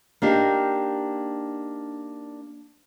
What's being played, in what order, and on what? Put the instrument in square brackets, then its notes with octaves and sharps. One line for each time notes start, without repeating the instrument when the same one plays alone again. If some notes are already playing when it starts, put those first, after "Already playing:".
[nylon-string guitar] A#3 D4 D#4 G4